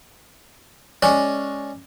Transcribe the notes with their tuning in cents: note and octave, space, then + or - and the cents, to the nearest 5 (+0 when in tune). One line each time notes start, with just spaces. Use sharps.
G#3 +0 C#4 +0 D5 +0